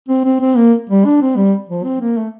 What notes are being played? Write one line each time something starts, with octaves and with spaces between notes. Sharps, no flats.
C4
C4
C4
A#3
G3
D4
C4
G3
F3
C4
A#3
A3